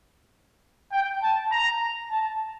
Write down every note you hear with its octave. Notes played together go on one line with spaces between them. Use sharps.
G5
A5
A#5
A5